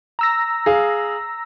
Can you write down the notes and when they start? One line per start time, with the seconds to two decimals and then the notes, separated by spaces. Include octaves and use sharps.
0.19 A#5 E6 A#6
0.66 G#4 F5